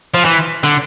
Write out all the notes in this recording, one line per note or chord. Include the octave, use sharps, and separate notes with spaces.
F3
E3
D3